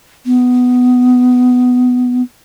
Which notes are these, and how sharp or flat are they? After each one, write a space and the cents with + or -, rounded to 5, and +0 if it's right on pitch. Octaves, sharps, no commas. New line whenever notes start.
B3 +10